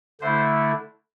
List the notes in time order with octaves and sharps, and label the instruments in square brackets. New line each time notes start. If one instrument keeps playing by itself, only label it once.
[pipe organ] D3 A3 E4 C5